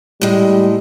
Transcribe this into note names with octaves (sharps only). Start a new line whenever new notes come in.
A2 G3 G#3